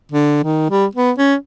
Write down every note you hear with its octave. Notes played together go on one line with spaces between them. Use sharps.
D3
D#3
G3
B3
C#4